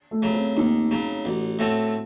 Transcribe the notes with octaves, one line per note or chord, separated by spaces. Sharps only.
A3
C#3 F#3
C4
D#2 D#4
C#3 F#3
A1 F#4
A2 A3 C4 F#4